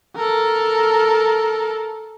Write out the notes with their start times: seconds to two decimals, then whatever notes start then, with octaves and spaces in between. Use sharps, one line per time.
0.16 A4 A#4